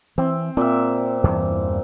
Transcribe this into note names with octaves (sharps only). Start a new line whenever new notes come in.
E3 C4
A#2 C4 E5
E2 G2 E3